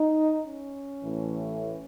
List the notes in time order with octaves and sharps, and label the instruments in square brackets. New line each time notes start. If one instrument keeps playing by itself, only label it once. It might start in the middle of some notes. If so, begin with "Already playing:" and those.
Already playing: [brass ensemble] D#4
C#4
A1 A2 E3 A3